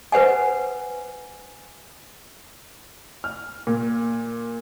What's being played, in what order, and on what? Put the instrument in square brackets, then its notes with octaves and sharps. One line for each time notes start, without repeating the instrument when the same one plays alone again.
[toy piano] B4 C5 F#5 G#5
[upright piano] F6
A#2